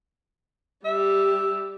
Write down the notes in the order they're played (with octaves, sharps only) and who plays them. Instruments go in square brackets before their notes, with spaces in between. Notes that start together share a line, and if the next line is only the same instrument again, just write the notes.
[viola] G3 G4 [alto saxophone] E5